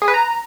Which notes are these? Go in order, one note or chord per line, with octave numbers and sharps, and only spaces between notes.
G#4
B4
A#5